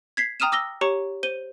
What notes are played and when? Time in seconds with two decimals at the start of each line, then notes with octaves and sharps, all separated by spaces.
0.17 G#6 B6 C7
0.40 G5 A#5 D#6 F6 D#7 E7
0.52 D6 E6 A#6 G7
0.81 G4 C#5 A#5 C#6 C#7
1.23 C5 D#7 G7